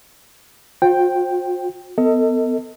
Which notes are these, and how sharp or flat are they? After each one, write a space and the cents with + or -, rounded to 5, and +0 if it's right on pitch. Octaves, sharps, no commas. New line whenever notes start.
F4 +45 C5 +20 G5 +0
B3 +25 A4 +35 D#5 +25